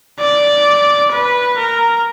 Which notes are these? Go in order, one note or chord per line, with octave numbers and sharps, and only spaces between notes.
D5
B4
A#4